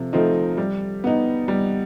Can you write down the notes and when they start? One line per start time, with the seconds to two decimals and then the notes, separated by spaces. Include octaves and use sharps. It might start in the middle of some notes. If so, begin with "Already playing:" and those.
Already playing: C3 F3 A3
0.13 F3 A3 C4 D#4
0.58 G3
1.04 B3 D#4
1.48 G3